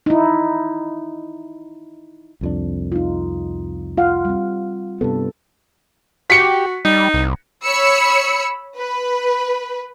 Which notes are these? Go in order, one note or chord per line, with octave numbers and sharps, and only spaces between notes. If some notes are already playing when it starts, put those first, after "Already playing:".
D#4 E4
C2 F2 D4
D#4 F4
F4 F5 F#5
G3 C4
G2 C3 B3 A4
F#4 G4 B6 C#7
G3 D#4
C2
C#5 B5 E6 C#7
B4